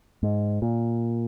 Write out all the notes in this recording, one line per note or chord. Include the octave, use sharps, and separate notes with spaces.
G#2
A#2